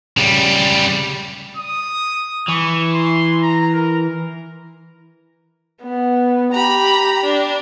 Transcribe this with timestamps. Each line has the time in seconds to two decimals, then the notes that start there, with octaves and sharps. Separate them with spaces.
0.17 C#3 G3
1.57 D#6
2.49 E3 C#6
2.94 C6
3.42 A#5
3.74 A#4
5.82 B3
6.53 G4 A#5 B5
7.24 D4